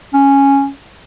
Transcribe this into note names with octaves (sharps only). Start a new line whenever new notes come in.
C#4